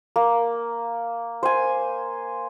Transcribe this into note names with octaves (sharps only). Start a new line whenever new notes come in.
A#3
C5 G#5